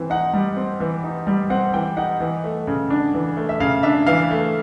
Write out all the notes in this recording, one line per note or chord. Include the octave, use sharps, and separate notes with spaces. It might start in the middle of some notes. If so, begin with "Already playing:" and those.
Already playing: E3 C4
D#4 F#5
G3
C4
E3
D#4
G3
C4 F#5
E3 G5
D#4 F#5
E3
A3
C#3
D4
E3
A3
E5
C#3 F5
D4 E5
E3 F5
A3